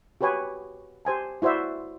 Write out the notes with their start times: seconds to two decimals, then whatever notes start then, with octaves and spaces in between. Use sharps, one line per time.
0.21 F#4 G4 B4 C#5 G#5
1.05 G4 C5 G#5 A5
1.42 E4 F#4 C5 D5 E5